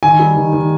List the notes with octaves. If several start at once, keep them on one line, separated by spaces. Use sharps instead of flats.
D#3 G#5
G3
D#3
D#3